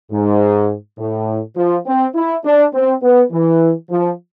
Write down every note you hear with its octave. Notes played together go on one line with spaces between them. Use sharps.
G#2
A2
F3
C4
E4
D4
C4
B3
E3
F3